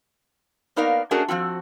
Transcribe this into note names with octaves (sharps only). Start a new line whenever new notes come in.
A#3 B3 D#4 A#4 D5 F5
A3 C#4 D4 F#4 G#4 A#4
F3 G3 C4 F#4